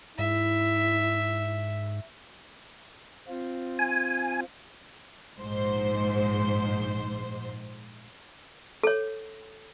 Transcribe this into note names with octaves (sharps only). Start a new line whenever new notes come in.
G#2 E4 E5
C4 F4
G#5
A#1 G#2 C5
A4 C#5